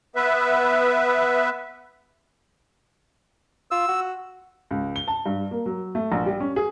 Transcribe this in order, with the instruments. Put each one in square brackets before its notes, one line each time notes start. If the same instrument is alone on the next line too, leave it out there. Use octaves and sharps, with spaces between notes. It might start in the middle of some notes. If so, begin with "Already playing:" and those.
[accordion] B3 B4 E5
[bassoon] F4 [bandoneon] E6
[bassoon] F#4
[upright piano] C#2
G7
A5
G2
A#3
F#3
A3
A#1
G3
C#4
G#4